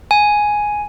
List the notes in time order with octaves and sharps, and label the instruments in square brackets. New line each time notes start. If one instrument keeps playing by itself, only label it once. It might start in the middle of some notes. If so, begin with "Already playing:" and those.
[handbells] G#5